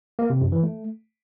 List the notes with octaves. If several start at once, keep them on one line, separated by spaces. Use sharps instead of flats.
A#3
C3
F#2
E3
A3